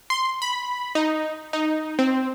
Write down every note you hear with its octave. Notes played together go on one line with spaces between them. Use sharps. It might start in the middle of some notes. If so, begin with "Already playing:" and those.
C6
B5
D#4
D#4
C4